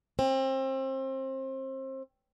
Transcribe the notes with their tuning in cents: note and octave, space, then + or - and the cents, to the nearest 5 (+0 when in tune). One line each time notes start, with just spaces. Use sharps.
C4 +30